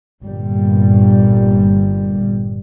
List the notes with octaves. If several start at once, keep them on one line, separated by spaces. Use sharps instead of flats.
G1 A#2 G3